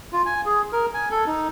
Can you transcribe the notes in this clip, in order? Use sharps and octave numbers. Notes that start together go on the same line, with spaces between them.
F4
G#5
G#4
A#4
G#5
A4
D#4